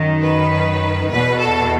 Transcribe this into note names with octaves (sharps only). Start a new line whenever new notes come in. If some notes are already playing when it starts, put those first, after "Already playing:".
Already playing: F#2 D#3
B4
E2 B2 B4
A4